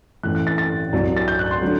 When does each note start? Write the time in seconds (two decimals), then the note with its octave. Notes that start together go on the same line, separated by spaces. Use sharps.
0.23 A1 A2 E3 F#6
0.35 F#6
0.47 A6
0.58 A6
0.93 C2 C3 F#3
1.17 A6
1.28 G6
1.39 F#6
1.51 C6
1.62 D3 F#3